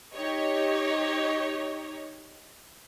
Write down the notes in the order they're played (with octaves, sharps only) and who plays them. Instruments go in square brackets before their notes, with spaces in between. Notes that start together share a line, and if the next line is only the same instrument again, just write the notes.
[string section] D#4 G4 C#5 D#5